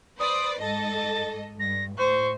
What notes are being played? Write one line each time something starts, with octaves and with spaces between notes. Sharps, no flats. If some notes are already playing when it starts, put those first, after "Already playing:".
B4 C5 D5 D#6
G#2 A4 D#5 A5
G2 A#6
A2 C5 C#6